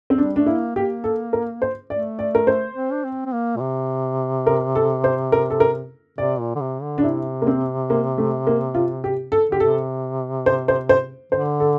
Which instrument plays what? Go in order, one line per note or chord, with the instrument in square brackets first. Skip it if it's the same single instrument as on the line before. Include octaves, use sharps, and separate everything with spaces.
[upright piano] C4
[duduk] G3 [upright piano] D4
[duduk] A3 [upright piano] D4
[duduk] A#3 [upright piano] E4
[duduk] A#3 [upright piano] G4
[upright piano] A4
A#4
C5
[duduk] A3 [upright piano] D5
[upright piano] D5
A#4
C5
[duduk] C4
D4
C4
C4
A#3
A#2
C3
[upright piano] A#4
A4
C5
A#4
A4
A#4
[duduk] C3 [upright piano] D5
[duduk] A#2
D3
C3
D3
[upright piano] D4
[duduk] C3 [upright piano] E4
[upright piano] A#3
C4
A#3
A3
A#3
F4
G4
A4
[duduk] D3 [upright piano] G4
[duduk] C3 [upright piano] A4
[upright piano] C5
C5
C5
[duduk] D3 [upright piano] C5
[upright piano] A4